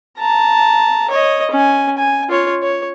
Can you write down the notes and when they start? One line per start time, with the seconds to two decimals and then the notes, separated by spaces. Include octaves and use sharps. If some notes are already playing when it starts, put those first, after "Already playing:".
0.19 A5 A#5
1.10 C#5 D#5
1.51 C#4 G#5
1.98 G#5
2.29 F4 C#5
2.62 C#5